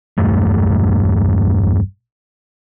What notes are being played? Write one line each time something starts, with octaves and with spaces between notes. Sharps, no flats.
B1 E2 G2 A3